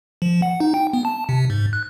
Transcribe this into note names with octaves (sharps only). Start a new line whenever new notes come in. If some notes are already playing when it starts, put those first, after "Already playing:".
F3
F#5
D#4
G5
B3
A5
C3
G#2
F#6